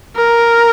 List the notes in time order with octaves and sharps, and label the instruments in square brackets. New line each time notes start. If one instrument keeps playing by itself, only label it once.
[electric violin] A#4